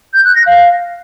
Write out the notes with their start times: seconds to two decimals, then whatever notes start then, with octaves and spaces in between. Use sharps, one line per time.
0.14 G6
0.25 F#6
0.35 A#6
0.46 F5